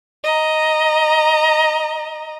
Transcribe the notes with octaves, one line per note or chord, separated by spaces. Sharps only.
D#5 A#5